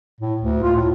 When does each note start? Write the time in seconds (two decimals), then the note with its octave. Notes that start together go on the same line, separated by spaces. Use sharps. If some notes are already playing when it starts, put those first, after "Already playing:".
0.21 A2
0.41 D2
0.62 F4
0.76 A2